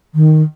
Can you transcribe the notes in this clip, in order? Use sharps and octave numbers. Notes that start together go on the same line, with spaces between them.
D#3